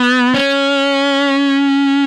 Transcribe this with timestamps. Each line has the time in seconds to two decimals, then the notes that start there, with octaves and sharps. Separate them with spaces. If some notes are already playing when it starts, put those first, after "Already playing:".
Already playing: B3
0.34 C#4